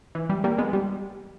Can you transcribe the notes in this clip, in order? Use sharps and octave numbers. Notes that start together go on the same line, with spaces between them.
E3
G3
G3 A#3
G#3 B3
G3